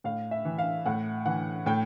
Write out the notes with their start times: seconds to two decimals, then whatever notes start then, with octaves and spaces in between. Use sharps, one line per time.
0.04 A2 F5
0.31 E5
0.45 E3
0.58 F5
0.86 A2 F#5
1.26 E3 F#5
1.66 A2 G5